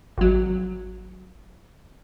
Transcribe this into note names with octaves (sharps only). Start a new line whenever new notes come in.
G#1 F#3